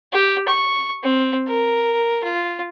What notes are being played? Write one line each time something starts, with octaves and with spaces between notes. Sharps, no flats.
G4
C#6
C4
A#4
F4